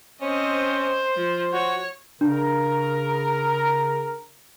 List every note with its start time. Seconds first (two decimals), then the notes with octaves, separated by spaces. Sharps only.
0.21 C4 C#4 C5 D#5
1.16 F3
1.53 F#4 C#5
2.21 C#3 D4 A#4